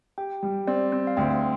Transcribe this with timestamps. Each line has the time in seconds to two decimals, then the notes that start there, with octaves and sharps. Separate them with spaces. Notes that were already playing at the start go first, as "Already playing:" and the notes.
0.18 G4 G5
0.43 G3
0.67 C4 D5
0.92 C4
1.07 F5
1.17 D2 G5